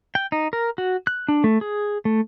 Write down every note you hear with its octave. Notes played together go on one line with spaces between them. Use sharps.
G5
D#4
A#4
F#4
F#6
D4
A3
G#4
A3